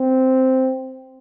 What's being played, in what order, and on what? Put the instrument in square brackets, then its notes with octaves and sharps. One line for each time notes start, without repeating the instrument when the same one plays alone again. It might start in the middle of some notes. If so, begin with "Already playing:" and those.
Already playing: [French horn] C4